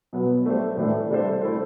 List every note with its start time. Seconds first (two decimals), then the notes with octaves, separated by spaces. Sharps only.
0.13 B2 F#3 B3
0.46 A3 D4 G4 C5
0.77 A2 E3 A3 D4
1.10 C3 G3 D4 A4 C5
1.42 A3 E4 A4 C5